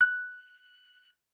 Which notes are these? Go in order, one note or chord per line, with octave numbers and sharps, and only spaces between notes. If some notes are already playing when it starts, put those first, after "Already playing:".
F#6